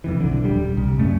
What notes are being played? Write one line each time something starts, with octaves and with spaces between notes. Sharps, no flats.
F2 C3 E3
B1 D3
D#1 G3
C2
F#2 A3 A#3 C#4